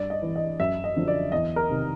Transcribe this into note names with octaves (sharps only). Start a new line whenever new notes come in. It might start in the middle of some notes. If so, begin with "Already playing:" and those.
Already playing: G2 D5
D#5
E3
D#5
F#2 E5
D#5
D3 F3
D5
E2 D#5
A#4
C3 D#3